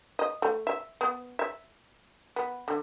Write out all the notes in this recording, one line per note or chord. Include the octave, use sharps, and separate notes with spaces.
D#5
A3
E5
B3
E5
B3
D3